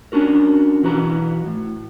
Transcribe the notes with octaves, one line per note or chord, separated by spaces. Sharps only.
C#4 D4 F#4 A#4
B1 E3 F#4 B4 A#5
A2